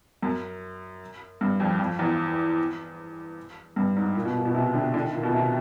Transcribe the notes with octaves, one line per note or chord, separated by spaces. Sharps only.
F#2
G2
F2
F2
E2
G2
G#2
A#2
B2
A#2
B2
C3
D3
D3
D#3
A#2
B2
C3